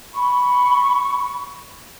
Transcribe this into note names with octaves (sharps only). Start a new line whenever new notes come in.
B5 C#6